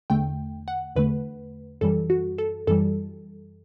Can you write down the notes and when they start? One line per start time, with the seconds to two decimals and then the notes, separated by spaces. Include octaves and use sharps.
0.10 E2 D3 A3 G5
0.68 F#5
0.96 E2 D3 A3 B4
1.81 F#2 E3 G3 A4
2.10 F#4
2.38 A4
2.67 F#2 E3 G3 A4